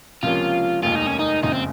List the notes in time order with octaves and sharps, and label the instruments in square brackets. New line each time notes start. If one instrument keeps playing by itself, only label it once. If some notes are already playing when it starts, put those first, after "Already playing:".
[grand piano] C#2 C3 F3 A#3 C#4 [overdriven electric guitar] F4
[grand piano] F1 D#2 D#3 G#3 [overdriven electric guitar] F4
[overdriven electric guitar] D#4
C#4
D#4
[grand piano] F#1 F2 C#3 G#3 [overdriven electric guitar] D#4
[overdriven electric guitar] C4